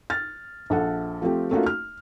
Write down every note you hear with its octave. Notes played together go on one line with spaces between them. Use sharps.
F6 A6
A#1 A4 F#5
F3 A3 C4 G4
A3 A#3 C#4 D#4 F4 F#4
F6